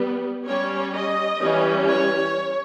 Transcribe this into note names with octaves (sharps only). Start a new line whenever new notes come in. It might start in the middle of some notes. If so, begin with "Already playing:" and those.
Already playing: G3 B3
G3 C#4 C#5
D#5
E3 G3 C#4
C#5